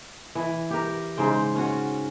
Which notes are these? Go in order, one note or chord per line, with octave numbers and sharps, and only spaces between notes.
E3
G4 A#4
G#2 C#3 C5 G5
C#4 F4 F#4